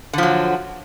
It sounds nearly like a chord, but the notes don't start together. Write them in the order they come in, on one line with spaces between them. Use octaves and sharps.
D3 F3 F#3